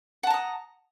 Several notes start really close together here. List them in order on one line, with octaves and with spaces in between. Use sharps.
F#5 A5 A#5 D#6